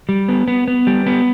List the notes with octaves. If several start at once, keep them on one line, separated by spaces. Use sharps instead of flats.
G3
B3
B3
B3
G3
B3